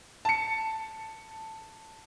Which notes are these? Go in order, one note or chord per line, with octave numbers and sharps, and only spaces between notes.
A5 C#7